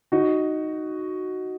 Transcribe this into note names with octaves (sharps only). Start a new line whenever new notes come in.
D#4 F#4